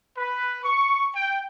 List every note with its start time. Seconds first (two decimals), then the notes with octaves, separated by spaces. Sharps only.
0.16 B4
0.64 C#6
1.15 G5